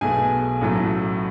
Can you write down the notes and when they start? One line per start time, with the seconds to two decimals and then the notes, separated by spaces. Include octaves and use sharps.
0.01 B1 B2 A3 G#4 G#5
0.61 A1 A2 F#3 A3